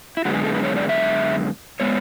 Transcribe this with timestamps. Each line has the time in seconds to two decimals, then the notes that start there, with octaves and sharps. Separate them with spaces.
0.17 E4
0.25 F#2 D3 G#3 B3 F#4
0.34 G#4
0.44 A4
0.54 B4
0.63 C#5
0.77 D5
0.89 E5
1.80 G#3 B3 C#5